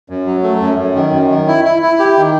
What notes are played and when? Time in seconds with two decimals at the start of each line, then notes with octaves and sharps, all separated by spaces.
0.10 F#2
0.26 F#3
0.43 A3
0.61 F#2
0.78 F#2
0.95 D#3
1.13 F#2
1.30 D#3
1.48 E4
1.65 E4
1.82 E4
1.99 G4
2.17 D#3